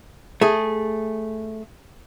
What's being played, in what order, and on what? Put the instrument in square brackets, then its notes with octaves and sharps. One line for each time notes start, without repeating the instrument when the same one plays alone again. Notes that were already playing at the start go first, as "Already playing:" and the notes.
[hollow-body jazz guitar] A3 G#4